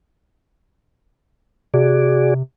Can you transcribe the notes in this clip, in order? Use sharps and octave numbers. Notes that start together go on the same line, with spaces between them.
C3 F#4 G#4 D5